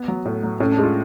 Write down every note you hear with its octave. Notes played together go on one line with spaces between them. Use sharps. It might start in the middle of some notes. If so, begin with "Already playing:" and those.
Already playing: B3
F#3
A2
F#3
A2 C#4
D4
G#3 F4